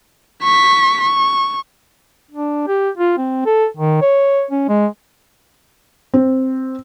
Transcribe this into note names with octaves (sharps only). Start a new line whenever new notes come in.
C#6 B6
C#6
D4
G4
F4
C4
A4
D#3
C#5
C#4
G#3
C4